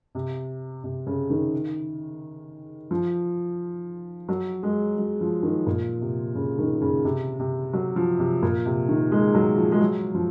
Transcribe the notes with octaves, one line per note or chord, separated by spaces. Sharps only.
C3
C3
C#3
D#3
F3
F#3
G#3
F#3
F3
D#3
A#2
C3
C#3
D#3
C#3
C3
C3
F#3
F3
C3
A#2
C3
D#3
G#3
F#3
F3
G#3
F#3
F3